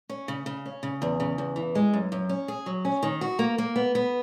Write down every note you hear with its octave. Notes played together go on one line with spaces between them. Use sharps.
C#4
C#3
C#3
C#4
C#3
E2
C#3
E2
E3
G#3
F#2
F#2
C#4
G#4
F#3
C#4
D#3
F#4
A#3
A#3
B3
B3